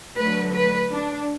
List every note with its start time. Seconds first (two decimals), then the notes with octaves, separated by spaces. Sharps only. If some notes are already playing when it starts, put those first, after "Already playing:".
0.18 D3 F#3 A3 B4
0.53 B4
0.91 D4